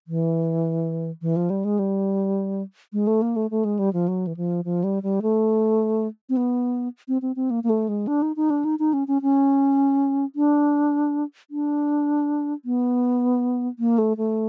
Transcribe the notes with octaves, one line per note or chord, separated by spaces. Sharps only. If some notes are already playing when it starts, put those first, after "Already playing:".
E3
E3
F3
G3
G#3
G3
G#3
A3
A#3
A3
A3
G#3
G3
F3
F#3
E3
F3
F3
G3
G3
A3
C4
B3
C4
C4
C4
A#3
A#3
A3
G#3
D4
D#4
D#4
D4
D#4
D#4
C#4
C#4
C#4
D4
D4
B3
A#3
A3
A3